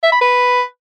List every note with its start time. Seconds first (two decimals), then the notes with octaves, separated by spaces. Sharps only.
0.03 E5
0.12 B5
0.21 B4